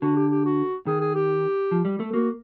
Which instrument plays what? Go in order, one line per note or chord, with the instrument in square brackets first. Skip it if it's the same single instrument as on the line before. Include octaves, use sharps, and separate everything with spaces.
[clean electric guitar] D3 [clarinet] F#4
[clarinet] G4
G4
F#4
[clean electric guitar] D#3 [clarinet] G#4
[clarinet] G#4
G4
[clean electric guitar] F3
G3
A3
[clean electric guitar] A#3 [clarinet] F#4